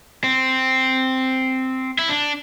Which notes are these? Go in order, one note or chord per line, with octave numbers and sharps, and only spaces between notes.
C4
E4
D4